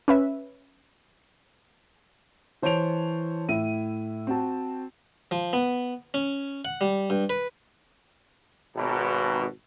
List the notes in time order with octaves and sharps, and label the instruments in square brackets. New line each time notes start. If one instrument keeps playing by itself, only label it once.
[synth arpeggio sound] C#4 B4 E5
[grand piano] E3 C5 C#5 A5 D7 F7
A2 E4 D#7
C4 F#4 A5
[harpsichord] F3
B3
C#4
F#5
G3
G2
B4
[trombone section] G#1 B2